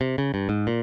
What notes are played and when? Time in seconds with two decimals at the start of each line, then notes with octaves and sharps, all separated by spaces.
0.01 C3
0.18 C#3
0.34 G2
0.49 G#2
0.67 A#2